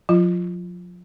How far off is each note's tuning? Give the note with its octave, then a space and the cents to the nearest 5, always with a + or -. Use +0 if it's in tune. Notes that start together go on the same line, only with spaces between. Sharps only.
F3 +40 F4 -15